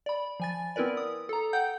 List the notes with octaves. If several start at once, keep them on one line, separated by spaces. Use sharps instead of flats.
D5 B5
F3 G#5 A6
B3 C4 E4 A#4 B4 D5
D#6
A4 A#5
F#5 G5 G6